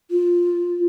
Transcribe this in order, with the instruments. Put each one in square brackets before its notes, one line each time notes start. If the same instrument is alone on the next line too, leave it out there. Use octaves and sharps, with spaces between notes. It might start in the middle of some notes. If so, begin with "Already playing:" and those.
[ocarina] F4